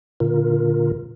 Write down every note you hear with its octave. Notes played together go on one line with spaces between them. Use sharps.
A#2 D3 F4 A#4